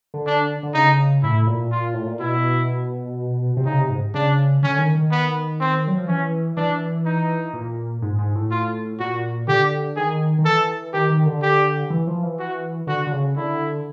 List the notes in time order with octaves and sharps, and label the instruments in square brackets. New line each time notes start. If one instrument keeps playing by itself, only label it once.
[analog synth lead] D3
[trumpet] D4
[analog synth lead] D3
[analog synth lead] C#3 [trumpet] D#4
[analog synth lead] A2 [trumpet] E4
[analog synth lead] A#2
[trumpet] F4
[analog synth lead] A2
A#2
[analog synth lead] B2 [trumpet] E4
[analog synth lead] C3
[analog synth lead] C#3 [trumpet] D#4
[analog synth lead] C3
G#2
[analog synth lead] C#3 [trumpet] D4
[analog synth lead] D3 [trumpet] C#4
[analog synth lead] D#3
D#3
[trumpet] B3
C4
[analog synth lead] F#3
F3
[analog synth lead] E3 [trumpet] C#4
[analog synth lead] E3 [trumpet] D4
[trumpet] D#4
[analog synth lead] A#2
G#2
G#2
A2
[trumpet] F4
[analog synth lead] A#2 [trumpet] F#4
[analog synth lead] D3 [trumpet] G4
[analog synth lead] D#3 [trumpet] G#4
[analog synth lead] D#3
[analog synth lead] E3 [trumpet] A4
[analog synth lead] D#3 [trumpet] G4
[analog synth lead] D#3
D3
[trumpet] G4
[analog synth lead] E3
F3
E3
[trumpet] F#4
[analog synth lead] D3 [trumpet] F#4
[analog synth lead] D3
C#3
[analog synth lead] D3 [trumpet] E4